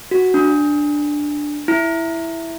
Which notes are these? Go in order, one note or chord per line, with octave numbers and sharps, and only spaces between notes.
F#4
D4
E4